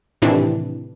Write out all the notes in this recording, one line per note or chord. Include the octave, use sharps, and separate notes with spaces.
A2 C3 D#3 E3 D4